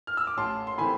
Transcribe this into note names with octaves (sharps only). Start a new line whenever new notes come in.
F6
E6
D6
A1 A5 C6
C6
A2 E3 A3 C4 G#5 B5